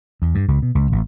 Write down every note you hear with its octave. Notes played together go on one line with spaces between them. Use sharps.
E2
G2
C#2
B2
C#2
A1